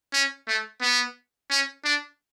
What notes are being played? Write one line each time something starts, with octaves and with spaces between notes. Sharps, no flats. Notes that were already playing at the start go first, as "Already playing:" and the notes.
C#4
A3
B3
C#4
D4